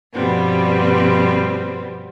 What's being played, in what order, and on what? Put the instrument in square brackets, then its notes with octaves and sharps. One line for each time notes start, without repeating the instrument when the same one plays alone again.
[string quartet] G2 B2 F3 G3 B3 C4